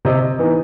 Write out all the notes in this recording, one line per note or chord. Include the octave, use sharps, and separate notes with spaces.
C3 D#5
E3 B3 D#4